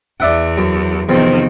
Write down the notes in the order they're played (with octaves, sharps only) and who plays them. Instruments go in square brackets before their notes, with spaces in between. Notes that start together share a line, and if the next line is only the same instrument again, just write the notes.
[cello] E2 [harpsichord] D5 E5 F#5
[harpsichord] F#2
[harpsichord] E2 F3 C4 [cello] C3 D#3